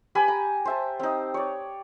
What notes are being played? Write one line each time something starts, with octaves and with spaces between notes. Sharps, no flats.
G4 B4 G#5 B5
A#5
C5 E5 A5
C4 D#4
C#5 D5